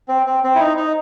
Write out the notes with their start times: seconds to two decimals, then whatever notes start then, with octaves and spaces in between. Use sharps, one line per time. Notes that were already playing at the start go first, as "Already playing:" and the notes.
0.08 C4
0.26 C4
0.44 C4
0.55 E4
0.60 D#4
0.77 D#4